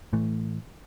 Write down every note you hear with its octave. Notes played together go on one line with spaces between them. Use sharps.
A2 E3 A3